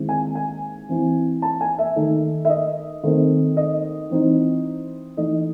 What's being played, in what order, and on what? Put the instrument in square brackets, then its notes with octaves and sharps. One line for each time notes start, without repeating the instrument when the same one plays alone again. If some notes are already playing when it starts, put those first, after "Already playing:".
Already playing: [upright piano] D#3 G#3 C4 E4
G#5
G#5
E3 C4 E4
A5
G#5
E5
D#3 A3 D#4
E5
D#5
D#3 A3 C4
D#5
E3 C4 D#4
E3 A3 D#4 D#5